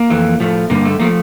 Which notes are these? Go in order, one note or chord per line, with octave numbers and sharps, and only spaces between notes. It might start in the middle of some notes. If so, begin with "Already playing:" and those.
Already playing: A#3
F2 E3 A3
A2 F3 A3
G2 D3 G3 A#3
A3
F3 A3 A#3